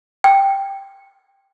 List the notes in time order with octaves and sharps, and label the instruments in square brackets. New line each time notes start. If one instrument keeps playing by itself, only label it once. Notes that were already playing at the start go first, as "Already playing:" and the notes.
[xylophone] G5